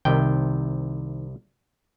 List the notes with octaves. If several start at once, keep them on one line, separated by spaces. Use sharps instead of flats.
C2 C3 D#3 G5